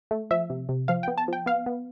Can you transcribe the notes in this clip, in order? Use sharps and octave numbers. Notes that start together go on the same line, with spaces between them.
A3
F3 E5
C3
C3
F3 F5
G5
B3
A5
F3 G5
B3 F5
B3